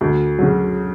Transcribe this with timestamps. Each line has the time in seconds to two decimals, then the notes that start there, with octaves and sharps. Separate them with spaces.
0.01 D2
0.39 C#3 F#3